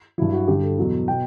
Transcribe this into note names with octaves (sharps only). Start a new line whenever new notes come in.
G2 F#3 E4
F#4
G2 D3 G3 G4
A4
E2 B2 F#3
B2 G5